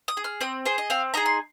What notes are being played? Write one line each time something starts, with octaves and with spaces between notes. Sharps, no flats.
D#6
G#4
F6
C4 D#6
G#4 C5
D#5
C4 F5
D#4 G#4 A#5
C6